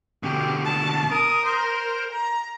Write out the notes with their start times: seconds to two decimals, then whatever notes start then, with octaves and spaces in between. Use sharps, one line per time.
0.23 B2 D3 G4
0.65 A5
1.12 A#4 D#6
1.45 C5
2.12 A#5